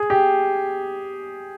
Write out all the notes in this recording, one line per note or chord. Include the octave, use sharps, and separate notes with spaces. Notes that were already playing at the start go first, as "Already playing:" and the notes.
Already playing: G#4
G4